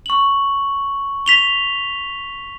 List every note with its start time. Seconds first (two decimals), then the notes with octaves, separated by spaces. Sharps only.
0.06 C#6 F#7
1.26 B6 F7 G7